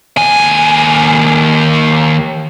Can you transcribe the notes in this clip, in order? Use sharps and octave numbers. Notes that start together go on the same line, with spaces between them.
D#2 G#5